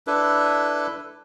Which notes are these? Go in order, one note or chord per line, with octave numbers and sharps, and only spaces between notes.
D4 E4 A4 B4